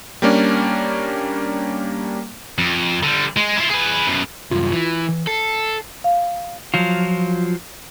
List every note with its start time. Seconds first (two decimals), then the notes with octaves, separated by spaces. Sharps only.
0.22 G3 A#3 C#4 D4
2.58 F2
3.03 D3 G3
3.37 G#3
3.57 E4 F4
3.70 G#4 B4
4.07 F#2 B2
4.51 C2 F#2 F4
4.72 E3
5.09 E3
5.27 A4 C7
6.04 F5
6.74 F3 F#3 F4